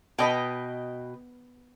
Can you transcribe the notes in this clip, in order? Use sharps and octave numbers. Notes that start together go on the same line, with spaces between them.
B2 B4 D#5 G5